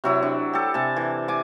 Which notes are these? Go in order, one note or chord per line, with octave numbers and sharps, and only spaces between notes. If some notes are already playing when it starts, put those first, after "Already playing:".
C3 F#3 E4
D4
G4 A4
C3 G#5 A5
E3
G#5 D6